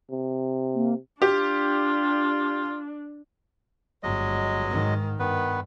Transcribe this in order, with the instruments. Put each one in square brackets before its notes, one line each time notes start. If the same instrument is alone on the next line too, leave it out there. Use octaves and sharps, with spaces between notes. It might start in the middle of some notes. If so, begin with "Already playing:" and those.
[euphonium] C3
[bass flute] A#3
[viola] D4 [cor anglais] F4 [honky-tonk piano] G4
[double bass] G1 [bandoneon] F#3 G#3 D#5
[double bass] G#2 D#3
[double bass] G2 [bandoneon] D#3 B3 B4